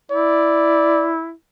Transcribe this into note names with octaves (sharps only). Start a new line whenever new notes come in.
E4 D5